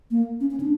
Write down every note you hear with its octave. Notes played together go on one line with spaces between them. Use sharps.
A#3
C#4
C#4
D4